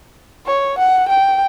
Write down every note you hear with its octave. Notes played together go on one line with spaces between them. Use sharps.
C#5
F#5
G5